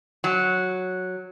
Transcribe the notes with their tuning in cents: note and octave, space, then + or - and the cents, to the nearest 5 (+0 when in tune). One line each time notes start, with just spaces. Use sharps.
F#3 -5